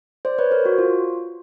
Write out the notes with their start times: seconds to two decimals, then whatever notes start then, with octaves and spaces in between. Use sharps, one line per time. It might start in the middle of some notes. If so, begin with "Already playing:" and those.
0.25 C5 D5
0.39 B4 C#5
0.51 A#4 C5
0.65 F#4
0.78 F4